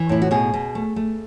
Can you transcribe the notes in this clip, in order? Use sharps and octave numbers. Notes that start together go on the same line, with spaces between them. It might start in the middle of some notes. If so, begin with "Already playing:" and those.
Already playing: E3
A2 E4
F#4
B2 G#4
B2
A3
A3